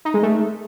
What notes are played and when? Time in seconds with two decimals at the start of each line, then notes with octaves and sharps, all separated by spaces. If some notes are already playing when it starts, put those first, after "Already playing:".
0.05 D#4
0.14 G#3
0.23 A3